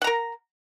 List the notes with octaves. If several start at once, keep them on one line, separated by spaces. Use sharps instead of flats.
A#4 F#5 A#5